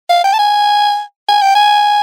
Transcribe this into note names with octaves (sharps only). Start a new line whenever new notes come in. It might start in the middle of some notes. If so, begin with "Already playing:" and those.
F5
G5
A5
G#5
G#5
G5
G#5